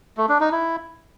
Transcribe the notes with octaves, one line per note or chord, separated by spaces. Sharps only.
A3
D4
D#4
E4